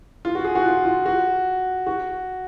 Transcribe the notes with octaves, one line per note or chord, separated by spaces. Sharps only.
F4
F#4
G#4
F#4
F4
F4
F#4
F#4